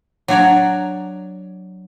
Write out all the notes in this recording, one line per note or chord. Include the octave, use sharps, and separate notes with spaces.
F#3 D4 F#4 C#5 D5 A#5